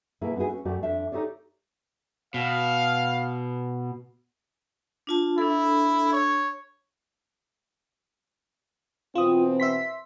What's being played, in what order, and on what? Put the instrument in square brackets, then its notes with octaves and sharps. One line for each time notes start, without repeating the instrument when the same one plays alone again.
[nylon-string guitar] B2 A#3 E4 G#4 E5
B3 D#4 E4 F#4 G#4
C#4
F#2 A3 F#4 G4 D5
F2 D4 E5
D#4 G4 A4 C#5 D5
[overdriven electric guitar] B2 [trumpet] F5
[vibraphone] D4 F4 A5
[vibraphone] D4 A4 [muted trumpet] E4
[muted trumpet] C#5
[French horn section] B2 E3 C4 [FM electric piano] F4 D#6
[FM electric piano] E5 C6 B6